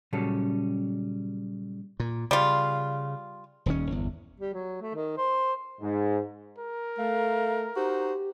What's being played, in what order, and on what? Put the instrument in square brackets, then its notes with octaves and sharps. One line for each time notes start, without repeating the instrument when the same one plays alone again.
[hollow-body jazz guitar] A#2 C#3 F#3 G3 C#4 A4
[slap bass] A#2
[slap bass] C#3 [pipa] G3 F4
[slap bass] D#1 D#2 C#4
G1 E2
[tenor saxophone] G3
F#3
A3
D#3
C5
[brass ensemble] G#2
[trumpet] A#4
[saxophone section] A3 [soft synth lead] F5
[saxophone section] D#4 F#4 C5 [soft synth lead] G4